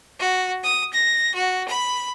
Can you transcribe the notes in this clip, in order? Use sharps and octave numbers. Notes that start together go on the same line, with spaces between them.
F#4
D#6
A#6
F#4
B5